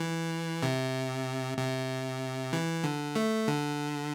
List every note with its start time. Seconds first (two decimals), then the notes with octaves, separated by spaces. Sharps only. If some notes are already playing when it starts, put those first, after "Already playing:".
Already playing: E3
0.63 C3
1.58 C3
2.53 E3
2.84 D3
3.16 A3
3.48 D3